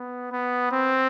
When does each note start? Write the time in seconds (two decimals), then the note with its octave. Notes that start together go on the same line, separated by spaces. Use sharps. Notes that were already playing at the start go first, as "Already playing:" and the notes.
Already playing: B3
0.32 B3
0.72 C4